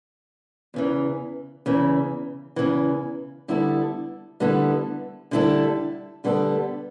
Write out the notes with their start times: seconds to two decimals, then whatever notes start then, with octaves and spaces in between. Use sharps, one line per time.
0.74 E2 C#3 E3
1.66 E2 C#3 E3
2.56 E2 C#3 E3
3.48 D3 G3 B3 E4 A4
4.40 D3 G3 B3 E4 A4
5.31 D3 G3 B3 E4 A4
6.24 D3 G3 B3 E4 A4